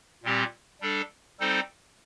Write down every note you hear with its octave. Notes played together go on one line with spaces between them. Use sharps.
A#2 G3 C4 G4
G3 D4 A4
G3 C4 D#4 A4 C5